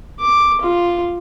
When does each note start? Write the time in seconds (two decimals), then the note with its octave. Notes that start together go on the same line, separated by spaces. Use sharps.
0.20 D6
0.61 F4